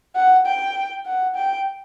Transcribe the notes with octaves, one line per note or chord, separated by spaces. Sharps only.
F#5
G5
F#5
G5